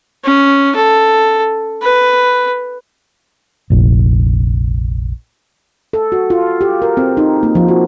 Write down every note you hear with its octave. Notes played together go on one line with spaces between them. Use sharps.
C#4
A4
B4
F1 A#1
A4
F#4
F4
G4
A#4
C4
D#4
A#3
F3
F#4